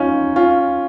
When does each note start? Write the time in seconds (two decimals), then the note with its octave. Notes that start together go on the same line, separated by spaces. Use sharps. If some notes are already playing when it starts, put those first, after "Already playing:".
Already playing: C#4 D#4 F4
0.36 C#4 F4